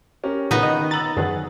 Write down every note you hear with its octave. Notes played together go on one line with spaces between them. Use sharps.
C#4 G4 A#4
A#2 C#3 B3 D#4
D#3 D#5
A#5 E6 A6 F#7
F#2 D3 D#3 G#4 B4 F#5